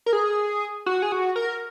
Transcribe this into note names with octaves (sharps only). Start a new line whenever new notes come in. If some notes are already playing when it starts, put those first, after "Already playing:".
A#4
G#4
F#4
G#4
F#4
A#4